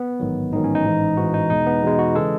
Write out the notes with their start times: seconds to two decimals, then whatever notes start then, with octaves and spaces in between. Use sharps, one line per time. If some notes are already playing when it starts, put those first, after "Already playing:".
Already playing: B3
0.20 A1 G#2 D#3 F#3
0.53 A1 G#2 D#3 F#3 D#4
0.64 C#4
0.75 D#4
0.85 A1 G#2 E3
1.17 A1 G#2 E3 F#4
1.34 D#4
1.50 E2 B2 G#3 D#4
1.66 B3
1.82 E2 B2 G#3
1.99 F#4
2.15 C#3 E3 G#3 A4